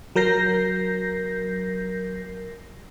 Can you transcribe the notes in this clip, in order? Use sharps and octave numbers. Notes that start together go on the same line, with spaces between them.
F#3 A#4 G6 A#6 C7